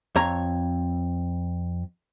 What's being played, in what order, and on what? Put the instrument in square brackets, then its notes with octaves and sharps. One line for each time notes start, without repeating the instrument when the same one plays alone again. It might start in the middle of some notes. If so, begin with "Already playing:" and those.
[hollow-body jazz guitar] F2 C#5 A#5